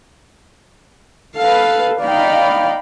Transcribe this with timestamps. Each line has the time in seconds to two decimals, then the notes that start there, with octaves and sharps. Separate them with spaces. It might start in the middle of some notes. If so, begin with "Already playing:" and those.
1.38 A4 B4 F5
2.01 D#4 D5 F5 G5 B5